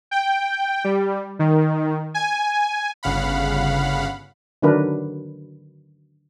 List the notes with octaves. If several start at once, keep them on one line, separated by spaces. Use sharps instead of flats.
G5
G3
D#3
G#5
G1 C#3 F5 F#5 B5
D3 D#3 F#3 D4 A#4 B4